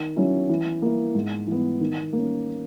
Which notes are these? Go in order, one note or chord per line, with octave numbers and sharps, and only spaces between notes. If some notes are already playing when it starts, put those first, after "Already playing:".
Already playing: D#3
F#3 C#4 E4
E3
A#3 E4
G#2
E3 B3
D#3
A#3 C#4